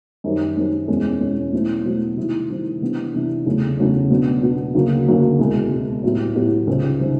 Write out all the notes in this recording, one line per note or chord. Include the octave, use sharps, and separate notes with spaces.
F#2 D#3 G3 C4
F#2 D#3 G3 C4
E2 B2 G#3 C#4
E2 B2 G#3 C#4
B2 F#3 A3 C4 E4
B2 F#3 A3 C4 E4
C3 D#3 G3 C4 E4
C3 D#3 G3 C4 E4
C3 E3 G3 B3 D4
C3 E3 G3 B3 D4
E2 C#3 F#3 A3 C#4
E2 C#3 F#3 A3 C#4
B2 F#3 B3 D4
B2 F#3 B3 D4
D2 C#3 F#3 A#3
D2 C#3 F#3 A#3
C2 B2 G#3
C2 B2 G#3
A2 F#3 B3 E4 G4
A2 F#3 B3 E4 G4
C#2 C3 D#3 G3 C4
C3 D#3 G3 C4